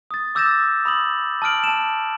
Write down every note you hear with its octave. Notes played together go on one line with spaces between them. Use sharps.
D#6 A6
D6 E6 G6 A6 A#6 E7
B5 D#6 F#7
A5 D#6 F6 D7 F#7
A5 E7